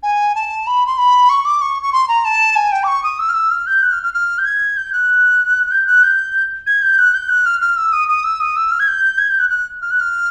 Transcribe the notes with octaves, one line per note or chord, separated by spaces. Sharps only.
G#5
A5
B5
C6
B5
C#6
D6
C#6
C#6
C6
A#5
A5
G#5
G5
D6
C#6
D#6
E6
F6
E6
F6
G6
F#6
F6
F6
F6
G6
G#6
G6
F#6
G6
F#6
G6
G#6
G6
F#6
G6
F#6
F6
F6
E6
D#6
D#6
E6
D#6
E6
F6
G#6
G6
G#6
G6
F#6
F#6
F6
F#6
F6